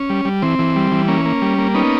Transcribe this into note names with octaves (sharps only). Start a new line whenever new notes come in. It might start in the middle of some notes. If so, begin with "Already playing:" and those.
Already playing: C#4
G3
G3
E3 C4
E3
G3
E3
A#3 C#4
A#3
G3
A#3
B3 C#4 D#4